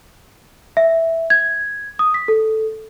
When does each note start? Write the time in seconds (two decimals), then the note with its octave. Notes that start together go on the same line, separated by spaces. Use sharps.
0.77 E5
1.30 G#6
1.99 D#6
2.14 B6
2.28 A4